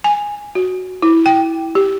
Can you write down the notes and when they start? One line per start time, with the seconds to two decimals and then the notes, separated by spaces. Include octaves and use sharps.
0.04 G#5
0.55 F#4
1.02 E4
1.26 G5
1.75 G4